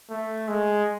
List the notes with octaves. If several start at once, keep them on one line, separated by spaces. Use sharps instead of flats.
A3
G#3